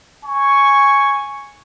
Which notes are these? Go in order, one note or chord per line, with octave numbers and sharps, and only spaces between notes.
G#5 C#6